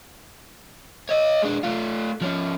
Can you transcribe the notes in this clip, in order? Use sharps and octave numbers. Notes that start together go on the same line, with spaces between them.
C#5 D#5
G#3 D4
A3 F4
F3 C#4